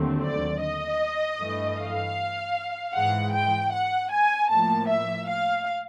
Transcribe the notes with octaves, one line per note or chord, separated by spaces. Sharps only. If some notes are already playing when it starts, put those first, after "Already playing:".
Already playing: D#2 D3 F#3 A3 C4
D5
D#5
G2 E3 A3
F5
G#2 E3 G#3 F#5
G5
F#5
G#5
A2 F3 A#3 A5
E5
F5